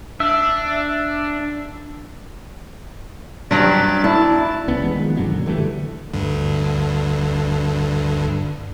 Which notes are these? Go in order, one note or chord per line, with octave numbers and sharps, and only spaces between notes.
D4 E5
G2 F#3 G3 D4 D5
E4 D5 A5
C2 B3 C#4
E3 G#3 B3
D#3 F3 G#3
F#2 A#2 D3 F#3
D3 E3 G3 A3
D2 G2 D3